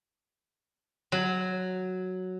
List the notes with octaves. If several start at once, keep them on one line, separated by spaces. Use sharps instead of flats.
F#3